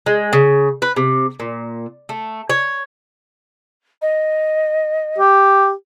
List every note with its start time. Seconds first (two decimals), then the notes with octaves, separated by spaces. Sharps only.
0.06 G#3
0.33 C#3
0.82 B4
0.96 C3
1.40 A#2
2.09 A3
2.50 C#5
4.02 D#5
5.19 G4